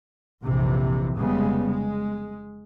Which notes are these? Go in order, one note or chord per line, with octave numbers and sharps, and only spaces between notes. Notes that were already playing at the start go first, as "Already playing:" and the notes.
A#1 F2 C3 E3
F1 C#3 G3 G#3 B3
G#3